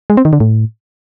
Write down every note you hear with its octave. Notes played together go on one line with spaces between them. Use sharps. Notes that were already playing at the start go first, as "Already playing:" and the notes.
G#3
C4
D#3
D3
A2